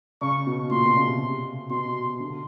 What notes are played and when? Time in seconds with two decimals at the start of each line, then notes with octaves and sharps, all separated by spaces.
0.21 C#3 C#6
0.46 B2
0.71 A#2 C6
0.84 B2
0.96 C#3
1.08 C3
1.70 B2 C6
2.20 D3